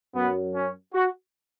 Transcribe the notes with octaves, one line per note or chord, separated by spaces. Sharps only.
F#2 F#3 B3
C#4
F#4